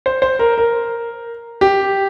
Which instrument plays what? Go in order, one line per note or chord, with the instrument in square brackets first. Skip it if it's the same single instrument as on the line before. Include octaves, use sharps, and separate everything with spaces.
[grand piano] C5
C5
A#4
A#4
G4